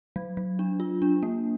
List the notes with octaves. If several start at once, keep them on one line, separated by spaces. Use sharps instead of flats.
F#3
F#3
D4
F4
D4
A#3